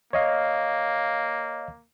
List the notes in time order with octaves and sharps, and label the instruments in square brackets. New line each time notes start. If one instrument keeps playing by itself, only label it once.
[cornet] A#3 [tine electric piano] C#5 D#5 F5